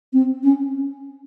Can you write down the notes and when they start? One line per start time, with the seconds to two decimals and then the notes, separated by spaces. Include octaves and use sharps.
0.13 C4
0.43 C#4